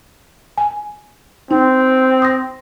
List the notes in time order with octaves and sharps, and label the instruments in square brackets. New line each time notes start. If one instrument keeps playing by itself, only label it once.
[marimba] G#5
[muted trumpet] C4 [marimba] D#4
[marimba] D#6 A#6